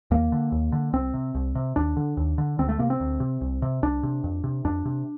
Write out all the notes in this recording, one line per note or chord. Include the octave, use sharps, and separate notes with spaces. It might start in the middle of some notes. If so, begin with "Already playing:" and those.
D#2 A#3
D3
D#2
D3
C2 C4
C3
C2
C3
D#2 D4
D3
D#2
D3
D2 C4
A3
C3 A#3
C4
D2
C3
C2
C3
C2 D4
C3
F2
C3
F2 D4
C3